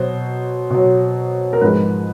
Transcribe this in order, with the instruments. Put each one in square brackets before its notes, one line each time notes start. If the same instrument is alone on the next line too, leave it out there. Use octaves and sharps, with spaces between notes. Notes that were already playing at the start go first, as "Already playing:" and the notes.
Already playing: [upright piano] B2 F#3 C5
B2 F#3
A#4
G#2 F3 G#3 B4